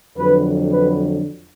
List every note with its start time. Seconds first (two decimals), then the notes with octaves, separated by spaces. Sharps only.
0.18 F2 D3 F#3 B4
0.72 B4